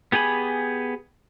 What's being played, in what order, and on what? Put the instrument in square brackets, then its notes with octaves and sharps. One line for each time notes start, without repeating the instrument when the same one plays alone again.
[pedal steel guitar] B3 G4 G#4 G#5 B5